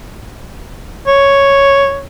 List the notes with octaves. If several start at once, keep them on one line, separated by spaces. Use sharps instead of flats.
C#5